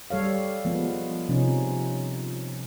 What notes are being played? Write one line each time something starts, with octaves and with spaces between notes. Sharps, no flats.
G3 A4 C#5 F5
F3 G#3 B3
C3 F3 C#4 D#4